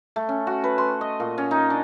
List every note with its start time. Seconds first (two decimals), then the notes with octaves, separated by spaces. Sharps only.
0.16 A3
0.29 C#4
0.47 F#4
0.64 B4
0.78 C6
1.01 D#5
1.20 A#2
1.38 C#4
1.51 D#4
1.70 D4